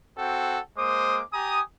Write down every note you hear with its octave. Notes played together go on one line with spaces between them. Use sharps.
C4 F#4 A4 F#5 G5
G#3 A#3 C5 D6 D#6
G4 G#5 A#5 D#6